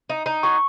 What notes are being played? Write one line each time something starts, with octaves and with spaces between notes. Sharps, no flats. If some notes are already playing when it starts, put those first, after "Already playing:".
D#4
D#4
F#3 C#6